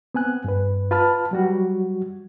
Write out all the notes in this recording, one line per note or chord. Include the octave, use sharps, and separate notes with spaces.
B3 C4 G#5 F#6
G2 B4
F4 B4 A5 B5 F6
F#3 G3 F#4